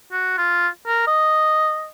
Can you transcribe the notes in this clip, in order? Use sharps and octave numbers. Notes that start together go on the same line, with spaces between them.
F#4
F4
A#4
D#5